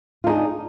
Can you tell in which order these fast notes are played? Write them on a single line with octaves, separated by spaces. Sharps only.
F4 D#4 G#4 D4